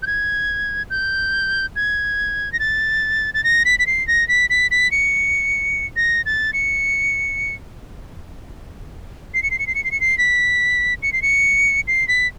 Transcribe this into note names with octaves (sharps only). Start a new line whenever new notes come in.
G6
G#6
G6
G#6
A#6
A6
A6
A#6
B6
B6
C7
A#6
B6
B6
B6
C#7
A#6
A6
C#7
C7
C#7
C7
C#7
C7
C#7
C7
C#7
C7
B6
C#7
C7
C#7
C7
B6